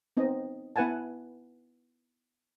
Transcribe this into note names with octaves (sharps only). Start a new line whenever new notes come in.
B3 C4 D#4 D#5
B3 E4 B4 F#5 G#5 A5